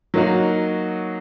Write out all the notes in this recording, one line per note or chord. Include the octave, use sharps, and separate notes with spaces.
F#3 A#3 D#4 F#4